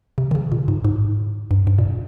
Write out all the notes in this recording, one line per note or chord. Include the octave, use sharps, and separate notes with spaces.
C3
D#3
C#3
A#2
G#2
G#2
G2
G2
A#2